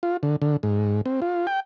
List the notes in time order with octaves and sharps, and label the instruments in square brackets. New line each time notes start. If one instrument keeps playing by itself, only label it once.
[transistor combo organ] F4
D3
D3
G#2
C4
F4
G5